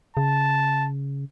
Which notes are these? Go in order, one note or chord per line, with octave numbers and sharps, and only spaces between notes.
C#3 A5